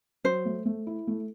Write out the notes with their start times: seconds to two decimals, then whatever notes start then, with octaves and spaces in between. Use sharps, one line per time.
0.24 F#3 C5
0.45 A3
0.66 A3
0.87 E4
1.07 A3